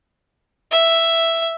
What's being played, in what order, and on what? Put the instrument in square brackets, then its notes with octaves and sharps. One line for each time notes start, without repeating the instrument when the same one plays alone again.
[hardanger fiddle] E5